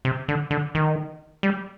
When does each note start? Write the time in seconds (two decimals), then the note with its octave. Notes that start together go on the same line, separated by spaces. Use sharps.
0.05 C3
0.28 D3
0.51 D3
0.75 D#3
1.43 G3